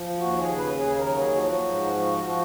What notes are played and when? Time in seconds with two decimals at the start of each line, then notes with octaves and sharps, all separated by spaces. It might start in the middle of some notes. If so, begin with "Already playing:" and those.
Already playing: F3
0.19 D#2 F#4
0.38 G#4
0.49 C#3
0.57 B4
0.77 D#2 G#4
0.98 A#4
1.06 F#3
1.17 G#4
1.35 F3 F#4
1.66 G#2
1.94 F3
2.24 F3